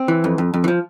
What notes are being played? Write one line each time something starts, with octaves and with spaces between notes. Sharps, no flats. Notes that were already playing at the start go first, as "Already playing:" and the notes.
Already playing: C4
E3
F2
F2
F2
E3
F3